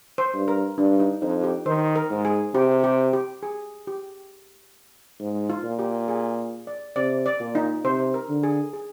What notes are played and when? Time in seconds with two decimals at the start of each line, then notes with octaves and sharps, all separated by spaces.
0.18 C5
0.34 G2
0.48 A#4
0.78 G2 D4
1.00 D#4
1.22 F2 D#4
1.44 G4
1.66 D#3 C5
1.96 A#4
2.11 G#2
2.25 G#4
2.55 C3 G4
2.84 G4
3.13 G4
3.43 G#4
3.87 G4
5.20 G#2
5.50 F4
5.64 A#2
5.79 G4
6.08 G#4
6.67 D5
6.96 C3 D5
7.26 D5
7.40 A#2
7.55 D#4
7.85 C3 C5
8.14 A#4
8.29 D3
8.43 G#4
8.73 G#4